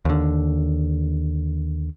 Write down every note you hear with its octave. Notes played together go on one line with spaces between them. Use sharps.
D#2 D3